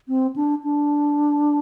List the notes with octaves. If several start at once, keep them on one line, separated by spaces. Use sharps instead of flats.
C4
D4
D4